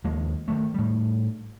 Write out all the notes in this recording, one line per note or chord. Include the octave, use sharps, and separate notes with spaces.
D#2 F3 G#3 A#3
D#3 F3 A3
A2 G3